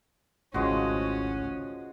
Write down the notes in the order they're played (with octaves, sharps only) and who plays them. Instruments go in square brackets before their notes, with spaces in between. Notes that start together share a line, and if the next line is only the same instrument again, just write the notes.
[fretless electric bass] G#1 C#2 A2 [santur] F3 G#3 F#4 [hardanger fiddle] C#4